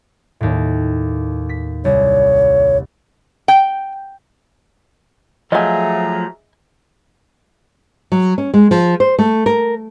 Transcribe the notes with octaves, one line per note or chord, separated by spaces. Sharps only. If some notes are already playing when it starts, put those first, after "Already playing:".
D#2 A2
B6
C2 C#5
G5
F3 F#3 A3 G#4 D#5 E5 G#5 A#5
F#3
C#4
G#3
F3
C5
A3
A#4